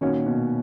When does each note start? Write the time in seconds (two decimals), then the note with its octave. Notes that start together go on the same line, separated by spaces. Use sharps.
0.01 A#2 D#3 A#3 C#4 F#4
0.26 B2